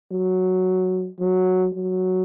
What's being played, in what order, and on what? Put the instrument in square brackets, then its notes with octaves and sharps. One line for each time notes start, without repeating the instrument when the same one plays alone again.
[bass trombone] F#3
F#3
F#3